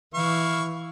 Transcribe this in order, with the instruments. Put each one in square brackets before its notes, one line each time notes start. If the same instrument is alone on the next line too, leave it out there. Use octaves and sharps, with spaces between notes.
[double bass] E3 [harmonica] E4 F5 C#6